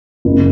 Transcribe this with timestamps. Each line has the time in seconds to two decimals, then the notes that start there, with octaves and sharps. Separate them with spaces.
0.25 F#1